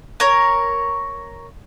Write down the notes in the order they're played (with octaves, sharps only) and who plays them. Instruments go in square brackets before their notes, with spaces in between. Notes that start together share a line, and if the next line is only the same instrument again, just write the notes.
[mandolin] A#4 C#5